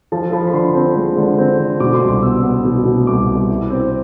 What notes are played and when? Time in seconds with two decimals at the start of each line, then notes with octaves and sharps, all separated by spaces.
0.12 F3 A5
0.32 F3 B5
0.48 B5
0.53 D3 C6
0.74 C4
0.96 G#3
1.17 D3
1.38 C4
1.59 D3
1.80 B2 D6
1.94 C6
2.02 C2
2.08 D6
2.22 B3 E6
2.43 B3
2.65 B2
2.85 B2
3.07 C2 D6
3.27 C2
3.49 E4
3.70 C4